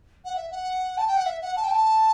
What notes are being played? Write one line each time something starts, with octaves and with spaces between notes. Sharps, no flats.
F#5
E5
F#5
A5
G5
F#5
E5
F#5
A5
G5
A5